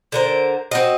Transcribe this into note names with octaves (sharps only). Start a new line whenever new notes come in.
D3 A#4 C5
C4 F#4 D#5